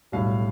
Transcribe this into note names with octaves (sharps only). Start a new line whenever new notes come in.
B1 A2 G3 F5